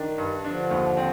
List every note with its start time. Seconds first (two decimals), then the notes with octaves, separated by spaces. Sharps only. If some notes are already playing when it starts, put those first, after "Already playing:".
Already playing: D#3 D4
0.18 G2
0.44 D3 F3 D4
0.71 D#2
0.97 C4